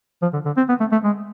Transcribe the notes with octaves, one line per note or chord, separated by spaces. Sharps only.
F3
D3
D3
C4
B3
A3
A3
G#3